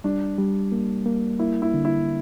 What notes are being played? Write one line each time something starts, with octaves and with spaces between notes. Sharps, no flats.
G3 D4
G3
A#3
A#3
A#3 E4
E4
D3
E4